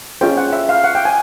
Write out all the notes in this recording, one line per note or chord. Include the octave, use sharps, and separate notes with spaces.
C#4 F4 G#4 C5 G5
F#5
E5
F5
F#5
G5
G#5